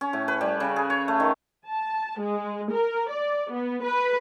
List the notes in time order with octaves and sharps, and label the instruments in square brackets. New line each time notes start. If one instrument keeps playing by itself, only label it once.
[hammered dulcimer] C#4
A2
B4
G3
C#3
G#4
C#5
A3
D#3
[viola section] A5
G#3
A#4
D5
B3
B4